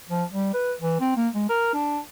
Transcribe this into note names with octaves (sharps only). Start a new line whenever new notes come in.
F3
G3
B4
E3
C4
A#3
G#3
A#4
D4